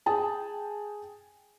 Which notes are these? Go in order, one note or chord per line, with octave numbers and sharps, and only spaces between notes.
G#4 G5 A5